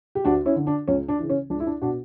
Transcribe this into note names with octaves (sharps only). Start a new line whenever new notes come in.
G4
D2 D4 F#4
C#4 E4
D3
D4
C#2 C#4
D4
C#3 E3
C#4
C#2 D4
E4
D4
B2 D4 F#4